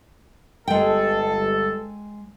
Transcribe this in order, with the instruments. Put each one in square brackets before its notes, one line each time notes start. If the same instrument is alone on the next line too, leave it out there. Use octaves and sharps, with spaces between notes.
[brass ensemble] G1 A4 [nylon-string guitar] G#3 G5